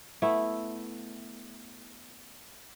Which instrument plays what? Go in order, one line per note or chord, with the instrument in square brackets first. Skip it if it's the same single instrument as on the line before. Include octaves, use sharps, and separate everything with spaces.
[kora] A3 B3 E4